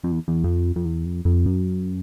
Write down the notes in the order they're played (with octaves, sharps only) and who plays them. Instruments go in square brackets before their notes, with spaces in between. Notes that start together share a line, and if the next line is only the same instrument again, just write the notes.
[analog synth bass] F2
E2
E2
F2
F2
E2
F2
F2
F#2